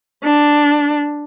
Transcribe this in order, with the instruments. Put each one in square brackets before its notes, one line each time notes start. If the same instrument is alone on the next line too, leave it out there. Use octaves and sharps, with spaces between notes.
[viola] D4